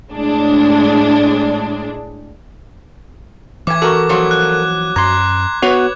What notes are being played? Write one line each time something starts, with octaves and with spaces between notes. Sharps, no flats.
A2 G#3 D4
A2 E3 G#5 D6 G#6
F#4 A4 A#4
F3 F#3 A#3
F#6
F#2 A#5 C6 D6 G#6
B3 F#4 B4 C#5